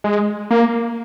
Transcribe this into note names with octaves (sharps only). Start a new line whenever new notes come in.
G#3
A#3